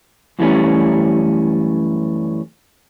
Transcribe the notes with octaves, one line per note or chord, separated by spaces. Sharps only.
F#2 E3 G3 A3 C#4